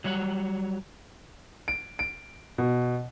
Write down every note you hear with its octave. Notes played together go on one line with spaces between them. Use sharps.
F#3 G3 C#5 E5 F#5
D7
D7
B2